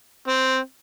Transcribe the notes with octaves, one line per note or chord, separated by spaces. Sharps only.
C4